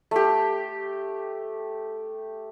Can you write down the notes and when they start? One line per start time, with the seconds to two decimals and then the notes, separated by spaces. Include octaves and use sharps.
0.11 A3 G4